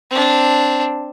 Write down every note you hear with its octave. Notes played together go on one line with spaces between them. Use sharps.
C4 D4